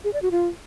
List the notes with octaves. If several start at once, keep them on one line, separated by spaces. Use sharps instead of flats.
G#4
D5
F#4
F4